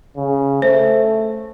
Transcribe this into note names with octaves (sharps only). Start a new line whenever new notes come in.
C#3
A3 C5